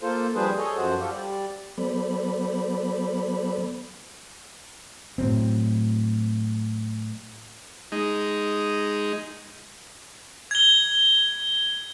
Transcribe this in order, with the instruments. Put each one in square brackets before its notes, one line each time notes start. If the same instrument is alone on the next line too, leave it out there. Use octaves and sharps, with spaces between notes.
[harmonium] A#3 F4 A4 C5
F3 G3 D4 G#4 B4 C5
G#4 A4 C#5 D#5
F#2 F3 F#4 C5 F#5
F4 G4 A4
G3 D5
[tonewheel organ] F#3 B3 A4 C5 D5 B5
[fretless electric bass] A2 F#3 C4
[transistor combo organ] G#3 D#4
[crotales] G#6 G7